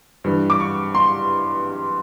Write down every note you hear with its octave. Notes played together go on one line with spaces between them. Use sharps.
G2 E3
D6
C#6
C6